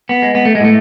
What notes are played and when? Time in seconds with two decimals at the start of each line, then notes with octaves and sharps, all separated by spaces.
0.09 B3
0.22 G#3
0.35 B3
0.45 A3
0.55 G#3
0.60 A2 A3